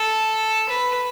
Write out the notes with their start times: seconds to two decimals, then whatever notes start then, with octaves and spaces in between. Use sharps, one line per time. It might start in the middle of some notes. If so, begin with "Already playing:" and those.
Already playing: A4
0.69 B4